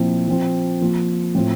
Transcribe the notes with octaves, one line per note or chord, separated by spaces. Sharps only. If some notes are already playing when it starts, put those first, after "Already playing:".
Already playing: A#2 F3 C4 E4
F3 C4 F4
F3 A#3 F4
A2 F3 C4 F4